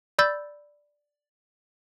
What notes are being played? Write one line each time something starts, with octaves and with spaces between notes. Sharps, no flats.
D5 B5 E6 G6 A6